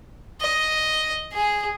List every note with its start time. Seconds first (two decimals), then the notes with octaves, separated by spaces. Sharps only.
0.41 D#5
1.33 G#4